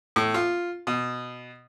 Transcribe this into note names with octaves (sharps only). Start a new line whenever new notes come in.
A2
F4
B2